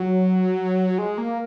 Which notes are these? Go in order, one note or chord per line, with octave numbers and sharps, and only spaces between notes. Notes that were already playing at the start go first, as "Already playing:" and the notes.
Already playing: F#3
G#3
A#3